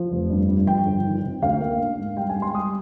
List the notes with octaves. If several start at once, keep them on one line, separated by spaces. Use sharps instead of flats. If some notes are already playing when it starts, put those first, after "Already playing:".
Already playing: F3
F1
G2
G2
F3 G5
G1
D#3
C3
D2 F5
A#3
D4
G#2
G3 G5
G#5
G#2
C6
G3 D#6